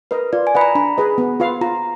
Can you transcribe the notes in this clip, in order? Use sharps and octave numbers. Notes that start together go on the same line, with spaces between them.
A#4 B4 D#5
F4 D5
G#5
B4 D#5 F#5 B5
A#5
D4 B5
G#4 B4 D#5
B3
F4 B4 F5
F4 A#5